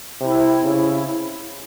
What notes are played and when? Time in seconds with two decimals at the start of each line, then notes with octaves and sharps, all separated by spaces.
0.21 C3 E4
0.64 C#3 E4